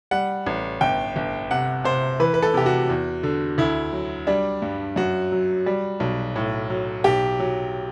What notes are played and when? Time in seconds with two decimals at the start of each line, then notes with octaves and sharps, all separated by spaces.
0.11 G3 F#5
0.47 A1
0.81 G1 G5
1.16 G1
1.51 C3 F#5
1.84 C3 C5
2.20 E3 B4
2.34 B4
2.42 A4
2.54 C3 G4
2.66 F#4
2.89 E2
3.23 D3
3.58 D2 E4
3.93 F#3
4.27 G3 D4
4.62 G2
4.96 F#2 F#4
5.32 F#3
5.66 G3
6.00 B1
6.36 A2
6.70 F#3
7.04 B1 G4
7.40 F#3